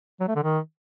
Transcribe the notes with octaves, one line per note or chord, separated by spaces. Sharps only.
F#3
A3
D3
D#3